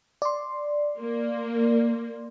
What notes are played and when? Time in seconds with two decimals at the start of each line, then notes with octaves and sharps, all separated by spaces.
0.22 D5 C6
0.99 A#3